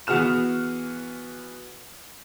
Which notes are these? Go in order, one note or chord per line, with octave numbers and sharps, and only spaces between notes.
E3 B3 F#4 G#4 F6 E7